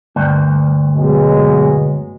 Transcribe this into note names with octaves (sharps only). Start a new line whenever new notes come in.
D2 G2
B2 F#3 G#3